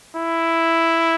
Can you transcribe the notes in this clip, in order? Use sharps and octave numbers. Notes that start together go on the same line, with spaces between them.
E4